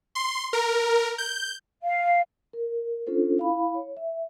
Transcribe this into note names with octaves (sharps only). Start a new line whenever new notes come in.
C6
A#4
G6
F5
A#4
C#4 D4 F4 A4 C5
E4 F5 B5
C#5
E5